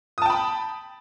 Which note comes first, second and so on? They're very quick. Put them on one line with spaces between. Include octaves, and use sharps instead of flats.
D#6 A5 G5 B5